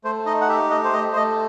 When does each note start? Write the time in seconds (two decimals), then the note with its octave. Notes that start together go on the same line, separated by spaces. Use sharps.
0.04 A3 C5
0.26 D#4 D#5
0.41 F#5
0.48 G4 E5
0.70 A3 D#5
0.84 C5
0.93 A3 D#5
1.12 C5
1.16 A3 D#5